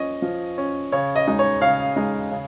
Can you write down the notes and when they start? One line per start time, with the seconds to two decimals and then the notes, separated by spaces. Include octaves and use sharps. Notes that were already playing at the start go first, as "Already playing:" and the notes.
Already playing: F3 C#4 D#5
0.22 F3
0.58 C#4
0.92 C#3 C#5
1.16 D#5
1.27 G#3 D#4
1.39 C#5
1.61 C#3 C#5 F5
1.96 G#3 D#4
2.31 C#3